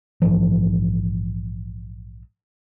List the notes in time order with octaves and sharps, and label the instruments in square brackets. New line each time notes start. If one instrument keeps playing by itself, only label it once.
[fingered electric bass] A#1 G#2 E3 F3